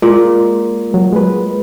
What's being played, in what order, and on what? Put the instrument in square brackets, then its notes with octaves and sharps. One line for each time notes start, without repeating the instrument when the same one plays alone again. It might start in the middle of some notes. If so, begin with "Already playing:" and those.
[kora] A#2 [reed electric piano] G#3
[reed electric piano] F#3
G#3 B4